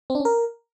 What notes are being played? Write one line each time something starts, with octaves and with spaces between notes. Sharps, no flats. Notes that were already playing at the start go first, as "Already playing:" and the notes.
C4
D4
C#4
A#4